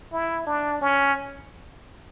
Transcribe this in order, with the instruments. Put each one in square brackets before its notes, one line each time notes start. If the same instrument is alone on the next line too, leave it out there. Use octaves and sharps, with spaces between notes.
[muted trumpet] E4
D4
C#4